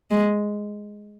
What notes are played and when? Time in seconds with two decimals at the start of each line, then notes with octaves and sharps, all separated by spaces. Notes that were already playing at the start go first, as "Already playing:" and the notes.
0.11 G#3